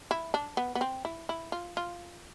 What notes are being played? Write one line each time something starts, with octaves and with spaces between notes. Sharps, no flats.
E4
D4
B3
B3
C4
E4
E4
F4
F4